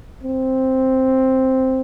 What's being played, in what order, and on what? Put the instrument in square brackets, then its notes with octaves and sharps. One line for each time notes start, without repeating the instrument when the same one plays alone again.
[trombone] C4